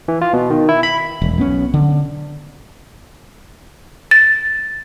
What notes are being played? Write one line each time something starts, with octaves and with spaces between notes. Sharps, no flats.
E3
F4
B2
D#3
E4
B5
E1
B1 B3 C#4
D3
A6